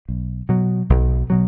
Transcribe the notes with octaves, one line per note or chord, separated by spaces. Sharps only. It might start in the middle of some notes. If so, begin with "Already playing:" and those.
B1
B2 F#3
B1
B2 F#3